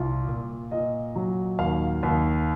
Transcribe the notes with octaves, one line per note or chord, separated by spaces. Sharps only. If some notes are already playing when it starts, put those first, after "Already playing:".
Already playing: C2 F4
A#2
A#2 D#5
F#3
D#2 F5
D#2